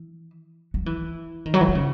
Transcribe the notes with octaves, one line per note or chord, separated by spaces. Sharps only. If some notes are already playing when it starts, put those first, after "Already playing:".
Already playing: E3
F#3
E3
D#3
F#3
E3
D#3
C#3